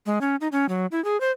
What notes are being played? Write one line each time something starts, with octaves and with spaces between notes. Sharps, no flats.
G#3
C#4
D#4
C#4
F#3
E4
G#4
C5